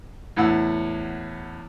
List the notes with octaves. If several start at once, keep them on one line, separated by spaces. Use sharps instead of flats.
E2 A2 F#5 E6